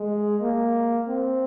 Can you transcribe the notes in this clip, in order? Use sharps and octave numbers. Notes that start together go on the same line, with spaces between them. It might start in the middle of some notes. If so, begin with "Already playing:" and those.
Already playing: G#3
A#3
C4